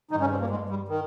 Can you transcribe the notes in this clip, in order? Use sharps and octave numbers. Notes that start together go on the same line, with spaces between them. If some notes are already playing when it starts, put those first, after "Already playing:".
G2 D#3 D#4
C#3 C#4
C3 C4
A#2 A#3
G#2 G#3
G2 G3
D#3